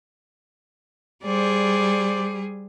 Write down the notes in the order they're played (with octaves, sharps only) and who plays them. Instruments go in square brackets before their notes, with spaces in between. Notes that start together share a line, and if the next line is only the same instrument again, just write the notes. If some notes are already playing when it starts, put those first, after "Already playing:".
[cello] G3 G#4 [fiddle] C5 D5